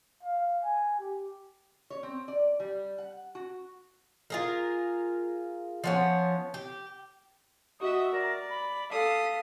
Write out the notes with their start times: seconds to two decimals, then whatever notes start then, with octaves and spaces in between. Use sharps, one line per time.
0.23 F5
0.63 G#5
0.99 G4
1.90 C#5
2.03 C4
2.28 D5
2.60 G3
2.98 F#5
3.35 F#4
4.30 F4 G#4 A#4
5.84 F3 B3 C#4
6.54 G4
7.80 F#4 D#5 E5 D#6
8.12 A#4 D5
8.50 B5
8.91 A4 F5 D#6 B6